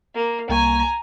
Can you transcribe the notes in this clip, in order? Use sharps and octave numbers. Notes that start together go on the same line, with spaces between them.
A#3
C2 A#3 G#5 A#5 C#6